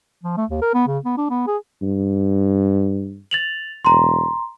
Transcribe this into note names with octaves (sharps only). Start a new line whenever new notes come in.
F3
A3
D#2
A#4
B3
C#3
B3
D4
B3
G#4
G2
A6 F7 F#7
E1 A#5 C6